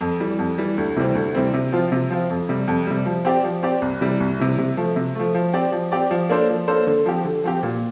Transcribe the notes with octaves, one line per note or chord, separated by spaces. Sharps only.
F2
E3 G3
F2
E3 G3
D2
C3 E3 G3 C4
D2
C3 E3 G3 C4
C3
F3 C4 F4
C3
F3 C4 F4
F2
C3 G3
F2
C3 G3
F3
C4 G4 D5
F3
C4 G4 D5
C2
C3 E3 G3
C2
C3 E3 G3
C3
F3 A3
C3
F3 A3
F3
C4 G4 D5
F3
C4 G4 D5
F3
A#3 D4 A4 C5
F3
A#3 D4 A4 C5
D3
F3 C4 G4
D3
F3 C4 G4
A#2